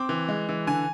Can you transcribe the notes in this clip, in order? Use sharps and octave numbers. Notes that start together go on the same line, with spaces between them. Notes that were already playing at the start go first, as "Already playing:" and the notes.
Already playing: C4 D6
E3
G#3
E3
D3 G#5